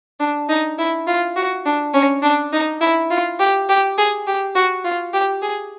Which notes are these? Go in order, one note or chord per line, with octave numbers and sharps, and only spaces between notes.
D4
D#4
E4
F4
F#4
D4
C#4
D4
D#4
E4
F4
G4
G4
G#4
G4
F#4
F4
G4
G#4